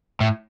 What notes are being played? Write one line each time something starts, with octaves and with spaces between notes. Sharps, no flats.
A2